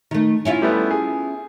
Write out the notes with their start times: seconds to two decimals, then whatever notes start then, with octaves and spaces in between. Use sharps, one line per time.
0.11 D#3 A3
0.45 C#4 E4 F4
0.62 G3 A3 B3
0.91 G#4